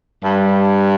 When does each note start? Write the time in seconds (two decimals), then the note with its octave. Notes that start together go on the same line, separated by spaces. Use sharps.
0.24 G2